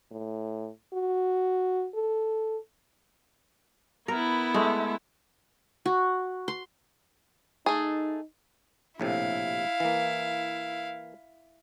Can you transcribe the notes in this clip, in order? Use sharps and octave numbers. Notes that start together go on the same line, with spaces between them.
A2
F#4
A4
B3 E4 A#4
G#3 A3
F#4
C6
A3 D#4 G#4
A#1 A2 C3 E4 F5
E3 A#3